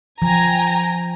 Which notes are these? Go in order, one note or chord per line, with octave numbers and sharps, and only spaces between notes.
F3 G5 G#5 A#5